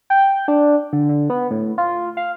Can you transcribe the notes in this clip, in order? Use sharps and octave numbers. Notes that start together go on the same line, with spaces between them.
G5
D4
D3
D3
B3
A2
F4
F5